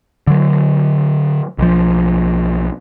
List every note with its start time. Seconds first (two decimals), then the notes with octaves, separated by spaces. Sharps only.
0.27 D3 F#3
1.58 B1 F3